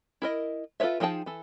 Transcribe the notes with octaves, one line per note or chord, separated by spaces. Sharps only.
E4 A#4 D#5
F4 A4 B4 C#5 E5
F3 D#4 G#4 G5 A5
E3 A4